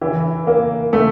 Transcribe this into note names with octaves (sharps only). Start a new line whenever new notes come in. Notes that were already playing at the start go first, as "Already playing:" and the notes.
E3
A#3
A3